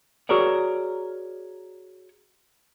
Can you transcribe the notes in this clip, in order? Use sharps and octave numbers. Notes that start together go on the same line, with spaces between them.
F#4 G#4 A#4 C#5 D5